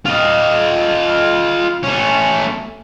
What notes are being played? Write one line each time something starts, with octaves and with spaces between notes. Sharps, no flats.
F4 D#5
A3 C#4